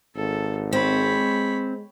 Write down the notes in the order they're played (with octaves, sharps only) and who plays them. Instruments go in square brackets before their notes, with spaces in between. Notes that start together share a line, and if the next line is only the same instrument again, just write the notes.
[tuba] G#1 [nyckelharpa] A4
[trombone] G#3 [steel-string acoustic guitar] C4 [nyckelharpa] C#5 B5